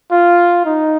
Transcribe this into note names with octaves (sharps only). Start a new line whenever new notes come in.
F4
D#4